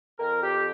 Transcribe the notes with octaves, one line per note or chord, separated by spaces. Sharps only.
F2 A#4
G4